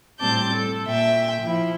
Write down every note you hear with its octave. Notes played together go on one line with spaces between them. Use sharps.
A2 G3 C4 A5 D6 G6
A4
A#2 E5 G5
F3 E4